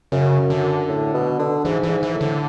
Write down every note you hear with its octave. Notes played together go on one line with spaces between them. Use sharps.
F#2 C#3
D3
A2
B2
D3
G#2 E3
E3
G#2
E3
A2
D3